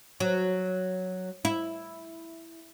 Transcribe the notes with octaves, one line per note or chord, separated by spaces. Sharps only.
F#3
E4